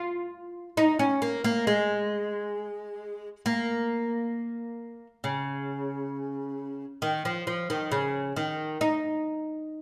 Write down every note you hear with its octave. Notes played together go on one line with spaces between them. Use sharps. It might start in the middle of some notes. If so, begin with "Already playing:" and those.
Already playing: F4
D#4
C#4
A#3
A#3
G#3
A#3
C#3
D#3
F3
F3
D#3
C#3
D#3
D#4